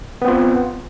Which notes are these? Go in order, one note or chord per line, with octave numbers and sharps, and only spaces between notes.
B3 C4 F4